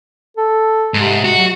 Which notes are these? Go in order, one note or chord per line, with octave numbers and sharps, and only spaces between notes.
A4
G#2 C3
F#4
F#3